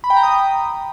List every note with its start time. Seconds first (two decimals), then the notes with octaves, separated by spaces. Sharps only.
0.04 B5
0.10 G5
0.17 A#5
0.23 D#6